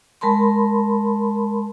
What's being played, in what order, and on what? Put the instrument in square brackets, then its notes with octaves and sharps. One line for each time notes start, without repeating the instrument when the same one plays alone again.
[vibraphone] G#3 A#4 A5 B5 C6